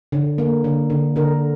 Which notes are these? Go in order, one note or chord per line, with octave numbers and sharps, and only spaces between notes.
D3
A#3
D3
D3
D3 A#4